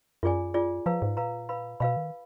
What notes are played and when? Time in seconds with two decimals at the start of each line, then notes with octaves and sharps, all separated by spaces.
0.23 F#2 F4 G#4 D5 G#5
0.54 F4 G#4 D5 G#5
0.86 F3 B4 F5 A#5
1.02 G#2
1.17 A#2 B4 F5 A#5
1.49 B4 F5 B5
1.80 B2 B4 F5 B5
1.97 D#3